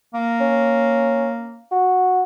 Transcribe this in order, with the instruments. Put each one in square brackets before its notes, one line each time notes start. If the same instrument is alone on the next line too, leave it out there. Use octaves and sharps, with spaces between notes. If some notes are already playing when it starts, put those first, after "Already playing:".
[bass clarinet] A#3
[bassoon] C#4
F#4